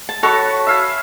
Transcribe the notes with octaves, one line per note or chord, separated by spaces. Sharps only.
A5
F#4 A4 C#5 F#5 A5 B5
E5 F5 G#5